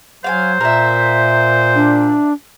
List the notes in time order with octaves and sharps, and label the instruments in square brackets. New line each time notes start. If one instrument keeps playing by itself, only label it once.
[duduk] F#3 [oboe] C5 [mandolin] F5 G5 G#5
[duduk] A#2 [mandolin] A#4 E5
[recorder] D4